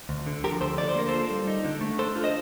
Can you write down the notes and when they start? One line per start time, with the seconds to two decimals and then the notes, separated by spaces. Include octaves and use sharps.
0.09 D2
0.27 D3
0.44 F3 G4 A#4
0.61 D2 A4 C5
0.78 D3 D5
0.89 C5
0.95 A#3 A#4
1.09 F4 A4 C5
1.31 G3
1.47 D#4
1.65 D3
1.81 A3
1.99 D4 A4 C5
2.16 F4
2.24 C5 D#5